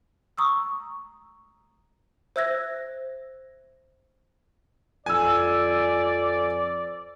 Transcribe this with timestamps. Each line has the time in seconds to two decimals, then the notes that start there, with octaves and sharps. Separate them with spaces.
0.38 A#5 C#6 D#6 E6
2.36 C5 E5 E6 F#6 G#6 A#6
5.06 F2 D5 G#5 E6